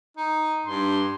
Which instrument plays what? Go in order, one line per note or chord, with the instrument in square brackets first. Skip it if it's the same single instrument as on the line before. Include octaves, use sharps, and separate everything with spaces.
[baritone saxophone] D#4
[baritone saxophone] G2 [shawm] C6